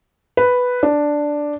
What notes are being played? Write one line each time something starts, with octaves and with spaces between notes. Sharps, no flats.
B4
D4